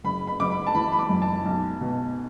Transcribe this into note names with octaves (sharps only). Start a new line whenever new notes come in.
F#1 B5
B5
F#1 D6
B5
A5
E3 B5
B5
D6
F#2
A5
B1
B2